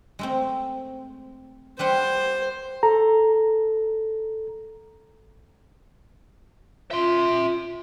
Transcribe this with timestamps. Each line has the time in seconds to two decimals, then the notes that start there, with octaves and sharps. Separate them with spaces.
0.19 G#3 A3 C4
1.79 G3 B4 C5 F#5
2.83 A4 A#5
6.91 F4 E5 C6